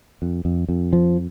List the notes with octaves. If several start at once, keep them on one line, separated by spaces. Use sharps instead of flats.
F2
F2
F2
F3